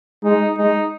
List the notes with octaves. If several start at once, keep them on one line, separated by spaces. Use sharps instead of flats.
G#3 D#4
G#3 D#4